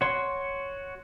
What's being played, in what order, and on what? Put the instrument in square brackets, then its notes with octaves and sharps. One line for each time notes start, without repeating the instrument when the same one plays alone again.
[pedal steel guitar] F#4 C#5 C6